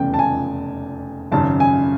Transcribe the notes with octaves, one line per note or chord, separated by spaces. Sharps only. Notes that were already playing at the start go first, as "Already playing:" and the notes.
Already playing: F1 E2 C#3 G5
A5
G#5
G#1 F#2 C#3 A5
G#5